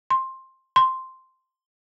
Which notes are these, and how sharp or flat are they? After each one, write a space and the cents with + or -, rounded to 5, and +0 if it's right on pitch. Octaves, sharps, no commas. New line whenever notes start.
C6 +10
C6 -5